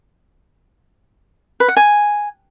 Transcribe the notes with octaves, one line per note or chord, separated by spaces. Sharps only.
B4
F#5
G#5